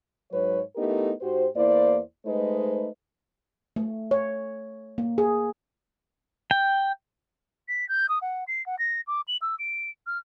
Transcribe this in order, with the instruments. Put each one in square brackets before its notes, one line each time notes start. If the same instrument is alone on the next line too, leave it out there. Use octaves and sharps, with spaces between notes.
[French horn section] G#2 F#3 B4 C#5
A3 B3 D#4 E4 G4 A#4
G#2 F#4 G4 C5
E2 A#3 E4 C5 D5
G#3 A3 D#4 B4 C5
[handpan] A3
C#5
A#3
G#4
[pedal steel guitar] G5
[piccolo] B6
G6
D#6
F#5
C7
F#5
A#6
D6
F#7
E6
D7
F6